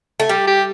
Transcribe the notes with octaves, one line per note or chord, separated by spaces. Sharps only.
A3
G3 G4
G4